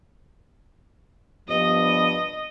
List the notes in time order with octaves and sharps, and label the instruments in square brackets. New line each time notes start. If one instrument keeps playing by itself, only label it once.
[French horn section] G2 F3 B3 [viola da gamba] D#5